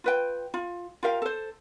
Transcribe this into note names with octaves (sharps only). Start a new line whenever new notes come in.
F4 B4 G5
F4
F4 G4 A#4 F5
A4 C5